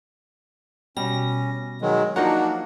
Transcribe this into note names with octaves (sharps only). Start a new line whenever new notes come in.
B2 G3 C#4 A#6
D#3 F#3 G#3
F3 F#3 A#3 D4 D#4 F#4 F#5